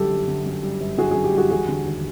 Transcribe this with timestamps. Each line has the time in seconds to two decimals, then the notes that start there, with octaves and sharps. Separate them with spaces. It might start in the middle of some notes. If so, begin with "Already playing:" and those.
Already playing: G1 F#2 D3 G3 G4 A4
0.11 G1
0.28 D3
0.46 F#2
0.63 G3
0.80 G1
0.98 D3 F#4 G#4
1.11 F#2 F#4 G#4
1.24 G4
1.32 G3
1.37 F#4 G#4
1.50 E1 F#4 G#4
1.68 D3
1.85 D#2